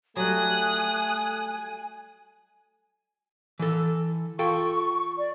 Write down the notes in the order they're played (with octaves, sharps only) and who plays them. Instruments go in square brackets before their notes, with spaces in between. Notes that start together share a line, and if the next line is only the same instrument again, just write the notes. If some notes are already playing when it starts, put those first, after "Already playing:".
[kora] F#3 G3 [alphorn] A3 [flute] G#5 [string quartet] D#6 F#6
[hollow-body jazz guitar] E3 A4
[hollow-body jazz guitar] F4 A4 G5 [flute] C#6
[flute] D5